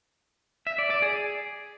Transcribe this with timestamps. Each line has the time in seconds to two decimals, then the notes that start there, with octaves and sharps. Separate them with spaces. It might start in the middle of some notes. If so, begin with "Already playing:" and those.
0.67 E5
0.78 D5
0.90 D5
1.02 G#4